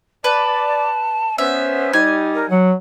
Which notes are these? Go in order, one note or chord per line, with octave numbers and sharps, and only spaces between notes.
B4 D5 A5
B3 C#4 C5 E5
G3 D#4 G#5
A#4
F#3 F#5